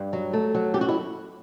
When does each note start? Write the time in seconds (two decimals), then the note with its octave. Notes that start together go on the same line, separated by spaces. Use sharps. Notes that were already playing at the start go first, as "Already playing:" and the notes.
Already playing: G2 G4
0.13 F#3
0.33 A3
0.55 F#3
0.74 F#2 G4
0.81 F#4
0.89 E4